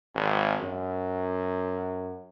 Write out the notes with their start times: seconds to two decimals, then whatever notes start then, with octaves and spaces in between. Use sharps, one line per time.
0.15 G#1
0.60 F#2